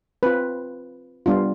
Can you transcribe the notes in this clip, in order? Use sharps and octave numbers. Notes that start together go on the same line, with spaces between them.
C4 F4 B4
G3 B3 D4 F4